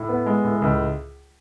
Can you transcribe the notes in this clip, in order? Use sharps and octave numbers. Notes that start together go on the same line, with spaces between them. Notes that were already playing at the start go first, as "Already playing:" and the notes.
Already playing: A2
B3
G#3
A2
C#2